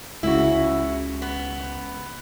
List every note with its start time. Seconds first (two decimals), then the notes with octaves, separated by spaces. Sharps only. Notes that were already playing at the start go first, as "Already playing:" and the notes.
0.23 C#2 C#3 E4 F#4
1.22 B3